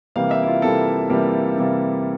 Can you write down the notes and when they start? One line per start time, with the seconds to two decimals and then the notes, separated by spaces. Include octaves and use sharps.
0.16 C3 E3 G3 A#3 F5
0.31 E5
0.43 E4
0.47 F4
0.62 C3 E3 G3 A#3 A4
1.10 C3 E3 G3 A#3
1.56 C3 E3 G3 A#3